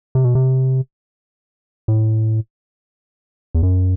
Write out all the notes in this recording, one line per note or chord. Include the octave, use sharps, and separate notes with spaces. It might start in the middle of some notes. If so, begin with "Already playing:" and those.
C3
B2
C3
A2
E2
F#2